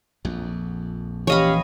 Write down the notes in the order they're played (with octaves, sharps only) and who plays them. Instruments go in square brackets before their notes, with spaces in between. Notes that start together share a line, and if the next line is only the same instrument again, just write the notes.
[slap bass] A#1 F2
[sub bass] E3 [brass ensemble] C#4 G4 F5 [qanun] C#5 D#5 B5